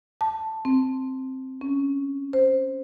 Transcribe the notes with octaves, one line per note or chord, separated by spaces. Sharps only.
A5
C4
C#4
C5